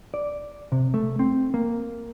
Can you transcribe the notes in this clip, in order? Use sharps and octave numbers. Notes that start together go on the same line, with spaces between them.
D5
C3
A3
C4
A#3